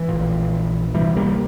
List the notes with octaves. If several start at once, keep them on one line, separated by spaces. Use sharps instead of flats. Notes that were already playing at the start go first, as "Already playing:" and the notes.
Already playing: E3
A#1 A#2
D2 C3 E3 G3
G3 A#3